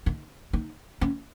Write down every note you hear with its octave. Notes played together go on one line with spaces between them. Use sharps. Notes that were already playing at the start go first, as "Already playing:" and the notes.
D#4
D#4
C#4